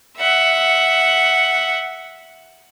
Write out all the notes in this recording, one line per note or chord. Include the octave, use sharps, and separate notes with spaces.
E5 F#5